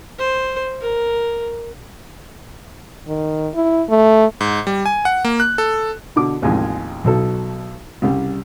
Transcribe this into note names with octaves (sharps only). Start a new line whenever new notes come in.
C5
A#4
D#3
E4
A3
G#2
G3
G#5
F#5
A#3
F#6
A4
B2 D3 D6
A1 D#2 C3 F3 G#3 G#5
B1 B2 A4
C2 C#3 G3